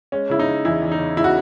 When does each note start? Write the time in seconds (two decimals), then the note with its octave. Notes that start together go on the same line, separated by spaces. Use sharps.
0.12 G#3 C#4
0.30 C#3 E4
0.39 D#4
0.47 C#3
0.65 E2 E4
0.83 E2
0.92 D#4
0.99 C#3
1.17 C#3 E4
1.24 F#4